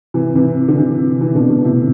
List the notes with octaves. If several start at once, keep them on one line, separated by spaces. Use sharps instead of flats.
C3 E3
C3 E3
D3
C3 E3
C3 E3
B2 D3
B2 D3
A2 C3